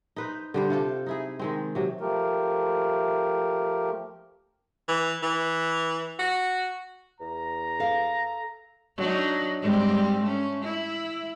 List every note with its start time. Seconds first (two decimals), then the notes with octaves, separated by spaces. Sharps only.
0.16 D#4 B4 C5
0.54 D3 G3 C5
0.70 C3 F4 A4 C5
1.06 D#4 E4 G#4
1.39 D#3 G#3 C4
1.75 C3 F#3
2.00 F3 A3 G4 A#4
4.88 E3
5.22 E3
6.19 F#4
7.20 E2 A#5
7.80 A4 F5
8.97 F#3 D4 D#4
9.61 G#2 G3 C4
10.22 A3 C#4
10.64 E4